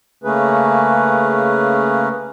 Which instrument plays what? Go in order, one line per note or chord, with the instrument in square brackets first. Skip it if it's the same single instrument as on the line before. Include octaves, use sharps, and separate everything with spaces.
[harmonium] C#3 A3 A#3 C#4 G#4 B4